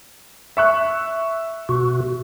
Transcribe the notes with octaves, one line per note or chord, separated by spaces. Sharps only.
E5 C#6 F#6
B2 F#4